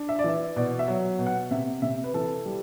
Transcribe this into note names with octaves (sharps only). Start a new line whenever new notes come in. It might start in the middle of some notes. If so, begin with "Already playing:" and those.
Already playing: D4
E5
D5
E3 E5
B2 D5
E5
F#3
B2
F#5
C3 E5
C3 E5
B4
E3 A4
G3